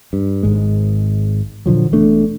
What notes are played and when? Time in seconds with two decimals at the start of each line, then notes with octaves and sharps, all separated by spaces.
0.13 G2
0.43 G#1 G#2 G#3
1.66 A#2 D3 F3 F#3
1.92 E1 E2 A3 D4